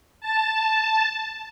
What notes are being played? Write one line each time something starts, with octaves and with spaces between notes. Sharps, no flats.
A5